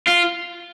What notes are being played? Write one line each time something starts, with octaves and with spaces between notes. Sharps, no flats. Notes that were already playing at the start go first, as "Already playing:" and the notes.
F4